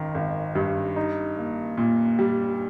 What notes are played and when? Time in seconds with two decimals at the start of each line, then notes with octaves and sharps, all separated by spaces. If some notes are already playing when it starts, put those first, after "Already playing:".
Already playing: G#1 D#3
0.14 G#1
0.55 G2
0.96 D#4
1.37 A#3
1.77 A#2
2.19 G3